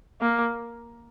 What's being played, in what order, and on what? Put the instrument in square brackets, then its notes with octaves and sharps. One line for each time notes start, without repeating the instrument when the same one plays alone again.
[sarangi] A#3